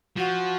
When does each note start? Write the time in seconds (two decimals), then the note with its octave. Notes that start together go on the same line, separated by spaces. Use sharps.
0.17 F3 F#4